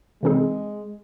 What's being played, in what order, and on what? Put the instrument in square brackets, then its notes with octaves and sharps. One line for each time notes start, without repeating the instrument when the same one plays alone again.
[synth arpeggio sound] C3 E3 C4 D#4 G#4 [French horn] G#3